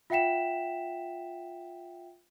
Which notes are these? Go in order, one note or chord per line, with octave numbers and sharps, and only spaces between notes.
F4 E5 F#5 G5 B6 E7